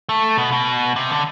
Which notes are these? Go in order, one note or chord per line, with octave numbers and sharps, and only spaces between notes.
A3
B2
B2
C3
D3